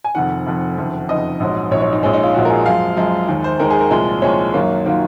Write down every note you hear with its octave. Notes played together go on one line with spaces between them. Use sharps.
G#5
F1 F2 D#3 F#5
F1 F2 D#3
F#1 F2 D#3
F#1 F2 D#3 D#5
A#1 G#2 F#3
A#1 G#2 F#3 C#5
C#5
D#4
A#1 A#2 G#3 C#4
D#4
F4
A#1 A#2 G#3 F#4
A#4
G#4
F#2 F3 G#3 F5
F#2 F3 G#3
D#2 D#3 G#3
C5
D#2 D#3 G#3 A#4
G#4
A#4
C2 A#2 F3 G#3
C2 A#2 F3 G#3 C#5
F#2 D#3 F#3 A#3
D#3 F#3 A#3 F4